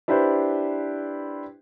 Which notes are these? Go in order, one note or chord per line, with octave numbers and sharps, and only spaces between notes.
D4 E4 G4 B4 C5